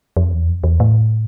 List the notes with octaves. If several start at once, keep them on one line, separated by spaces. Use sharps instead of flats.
F2
E2
F2
E2
A2